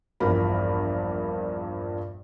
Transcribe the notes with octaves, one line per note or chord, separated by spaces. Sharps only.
A#1 E2 G2 F3 A#4 B5